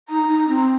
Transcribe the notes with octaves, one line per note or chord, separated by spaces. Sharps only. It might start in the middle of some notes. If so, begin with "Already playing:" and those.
D#4 A#5
D#4
C4